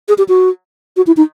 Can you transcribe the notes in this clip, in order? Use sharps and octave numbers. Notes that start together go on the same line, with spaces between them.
G#4
G4
F#4
F#4
E4
D#4